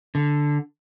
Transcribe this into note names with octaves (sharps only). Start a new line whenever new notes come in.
D3